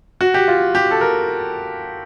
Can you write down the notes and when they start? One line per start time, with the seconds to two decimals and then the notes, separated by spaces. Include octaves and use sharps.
0.21 F#4
0.34 G4
0.48 F4
0.75 G4
0.91 A4
1.01 A#4